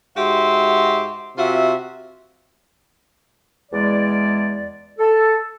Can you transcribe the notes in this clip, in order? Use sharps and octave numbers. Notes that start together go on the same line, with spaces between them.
G#2 F#4 G4 E5 C6
C3 F4 F#4 E5
E2 G#3 D5
A4